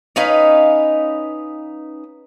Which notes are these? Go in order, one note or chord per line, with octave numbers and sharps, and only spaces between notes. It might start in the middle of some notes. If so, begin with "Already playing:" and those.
C#4 D#4 B4 F5